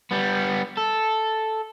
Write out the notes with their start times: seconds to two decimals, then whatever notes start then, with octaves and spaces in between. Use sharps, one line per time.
0.11 G3 B3
0.77 A4